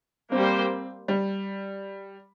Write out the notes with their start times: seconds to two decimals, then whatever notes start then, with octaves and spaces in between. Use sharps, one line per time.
0.32 G3 A#3 C4 G4 C5
1.08 G3